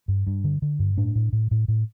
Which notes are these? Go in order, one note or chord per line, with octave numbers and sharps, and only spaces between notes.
G2
G2
D3
D3
G2
A2 D4
A2
A2
A2
A2